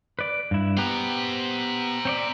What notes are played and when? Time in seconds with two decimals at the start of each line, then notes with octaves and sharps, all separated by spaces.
0.19 B4 D5
0.51 G2 E4
0.77 B3 G4 B4 C5 A#5
2.05 C4 C#5 D5